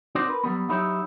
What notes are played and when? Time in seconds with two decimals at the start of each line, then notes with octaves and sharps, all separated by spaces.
0.15 C4 D#4 F#4 C5 D5
0.28 A#4 B4
0.44 F#3 G3 B3
0.69 F#3 D#4 E4 G4 C#5